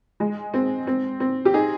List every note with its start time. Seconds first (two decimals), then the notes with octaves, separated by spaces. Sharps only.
0.20 G#3
0.54 C4
0.87 C4
1.20 C4
1.45 G4
1.54 D#4 G#4